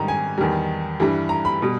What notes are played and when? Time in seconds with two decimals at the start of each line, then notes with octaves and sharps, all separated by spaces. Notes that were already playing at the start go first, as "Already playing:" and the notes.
Already playing: G#2 D#3 G3 A#5
0.08 G#5
0.38 E2 D#3 G3
1.00 G2 E3 G3
1.29 A#5
1.45 B5
1.62 B2 G3